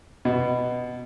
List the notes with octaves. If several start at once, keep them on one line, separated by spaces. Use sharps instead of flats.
B2